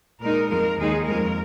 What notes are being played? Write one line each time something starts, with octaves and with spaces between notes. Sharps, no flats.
A#2 G#3 D#4 A#4
F2 F3 G#3 A#4
D#2 D#3 G#3 D#4 G#4
F2 D#3 G#3 A#4